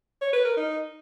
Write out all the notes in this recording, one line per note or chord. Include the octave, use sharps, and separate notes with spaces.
C#5
B4
A#4
D#4